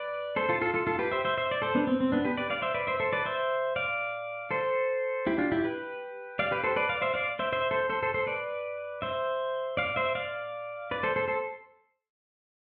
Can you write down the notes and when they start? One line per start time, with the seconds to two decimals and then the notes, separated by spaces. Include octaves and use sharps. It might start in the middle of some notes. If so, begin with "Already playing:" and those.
Already playing: B4 D5
0.36 A4 C5
0.49 F4 A4
0.62 F4 A4
0.74 F4 A4
0.87 F4 A4
0.99 G4 B4
1.11 C5 E5
1.25 C5 E5
1.37 C5 E5
1.51 D5
1.62 A4 C5
1.75 B3 D4
1.87 C4
2.00 C4
2.12 B3 D4
2.25 G4 B4
2.37 B4 D5
2.50 D5 F5
2.62 C5 E5
2.74 B4 D5
2.87 C5 E5
3.00 A4 C5
3.13 B4 D5
3.26 C5 E5
3.76 D5 F5
4.51 A4 C5
5.27 E4 G4
5.38 D4 F4
5.52 E4 G4
5.64 G4 B4
6.39 D5 F5
6.51 G4 B4
6.64 A4 C5
6.76 B4 D5
6.89 D5 F5
7.02 C5 E5
7.14 D5 F5
7.39 C5 E5
7.53 C5 E5
7.71 A4 C5
7.90 A4 C5
8.03 A4 C5
8.14 A4 C5
8.27 B4 D5
9.02 C5 E5
9.77 D5 F5
9.96 C5 E5
10.15 D5 F5
10.91 B4 D5
11.03 A4 C5
11.16 A4 C5
11.28 A4 C5